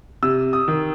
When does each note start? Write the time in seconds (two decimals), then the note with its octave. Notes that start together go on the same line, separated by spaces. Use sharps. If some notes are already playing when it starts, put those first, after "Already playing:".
0.23 C3 E6
0.53 D#6
0.68 D#3